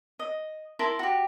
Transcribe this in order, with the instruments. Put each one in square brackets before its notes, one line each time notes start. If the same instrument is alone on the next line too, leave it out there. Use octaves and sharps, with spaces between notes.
[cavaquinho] D#5
E4 A#4 A5 C6
F#4 G4